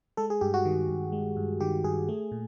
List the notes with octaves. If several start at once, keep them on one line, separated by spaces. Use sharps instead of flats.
G#3 A4
G#4
G2 G4
F#4
D#3
G2
G#3
G2
D#3 G4
G2 G#4
A3
A#2